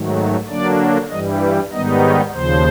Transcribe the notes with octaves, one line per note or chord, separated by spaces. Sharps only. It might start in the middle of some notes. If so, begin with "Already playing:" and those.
Already playing: G#2 D#3 F#3 A3
D3 F#3 A#3 D4 D5
G2 E3 G3 D#5
G#2 D#3 G3 B3 D#4 D#5
C#5
D#2 C#3 F3 C5